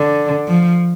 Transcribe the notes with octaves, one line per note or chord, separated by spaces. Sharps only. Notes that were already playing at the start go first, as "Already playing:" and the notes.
Already playing: D3
F3